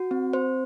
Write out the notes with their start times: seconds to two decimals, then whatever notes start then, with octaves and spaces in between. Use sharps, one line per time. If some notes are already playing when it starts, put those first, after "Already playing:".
Already playing: F#4
0.11 C4
0.33 C4 C5